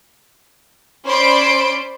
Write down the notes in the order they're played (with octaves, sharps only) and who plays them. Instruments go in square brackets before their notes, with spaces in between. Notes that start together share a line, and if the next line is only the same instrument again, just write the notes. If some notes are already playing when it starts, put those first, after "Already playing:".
[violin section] C#4 C5 D5 B5 C6 D7